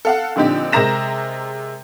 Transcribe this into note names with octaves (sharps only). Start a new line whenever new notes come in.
A4 F5 F#5
A#2 D3 F3 C4 D#4 G4
C3 G#3 A#4 A#5 A#6 E7